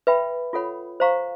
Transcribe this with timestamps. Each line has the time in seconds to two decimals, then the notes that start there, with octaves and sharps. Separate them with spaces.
0.07 B4 E5 G5 B5
0.53 F4 A4 C#5 F#5 B5
1.00 C5 F5 A#5 C#6